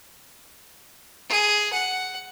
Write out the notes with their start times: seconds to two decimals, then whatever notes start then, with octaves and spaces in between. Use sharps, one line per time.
1.29 G#4
1.73 F#5